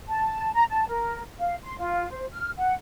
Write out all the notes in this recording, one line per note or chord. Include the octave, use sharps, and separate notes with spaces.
A5
A#5
A5
A#4
F5
C6
F4
C5
F6
F#5